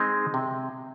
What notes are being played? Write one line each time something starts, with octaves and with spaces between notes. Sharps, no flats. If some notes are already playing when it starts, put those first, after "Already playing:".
Already playing: G#3 C4 D#4
C3